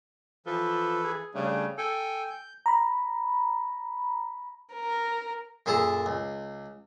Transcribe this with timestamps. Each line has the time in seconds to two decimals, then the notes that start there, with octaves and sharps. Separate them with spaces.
0.46 E3 F3 A4 B4
1.04 G#4
1.35 C#3 G3 A3 D4
1.78 A4 G5 G#5
2.30 G6
2.66 A#5 B5
4.75 A#4
5.66 F#2 A#2 G#4 A4 A5 A#5
6.06 C#2